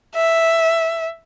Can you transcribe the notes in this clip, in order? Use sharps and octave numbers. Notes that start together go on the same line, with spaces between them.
E5